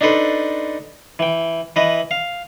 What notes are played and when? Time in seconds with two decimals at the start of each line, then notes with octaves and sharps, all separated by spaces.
0.01 D4 D#4 A4 B4 C5
1.19 E3 G5
1.76 E3 B4 D#5
2.11 F5